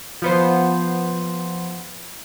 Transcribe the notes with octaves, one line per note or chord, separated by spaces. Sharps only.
F3 B3 C5